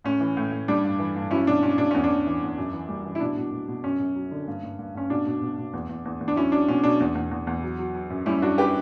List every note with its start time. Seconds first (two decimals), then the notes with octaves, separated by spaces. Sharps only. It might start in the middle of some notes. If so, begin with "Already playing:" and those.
0.04 A2 C#4
0.20 E3
0.37 A2
0.52 A2
0.68 G3 D4
0.84 G2
0.99 E3
1.16 G2
1.31 F#3 C#4 E4
1.47 B2 D4
1.63 B2 C#4
1.78 B2 D4
1.91 E2 C#4
2.04 D4
2.10 E2
2.27 E3
2.42 E2
2.58 F#2
2.73 E3
2.89 G3
3.05 E3
3.15 E4
3.20 B2 D4
3.37 B2
3.52 B2
3.68 B2
3.84 F#2 C#4
4.00 F#2
4.16 F#3
4.31 D3
4.48 G2
4.63 G2
4.79 G2
4.95 G2 C#4
5.10 B2 D4
5.26 B2
5.42 B2
5.58 B2
5.73 E2
5.89 E2
6.05 E2
6.21 E2
6.28 D4
6.36 F#3 C#4 E4
6.52 F#3 D4
6.68 B2 C#4
6.83 B2 D4
7.00 E2
7.15 E2
7.31 E2
7.47 E2
7.63 F#3
7.79 F#3
7.95 F#3
8.10 F#2
8.26 G3 C#4 E4
8.42 F#2 D4 F#4
8.58 G4 B4